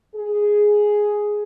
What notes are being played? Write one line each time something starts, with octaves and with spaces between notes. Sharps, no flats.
G#4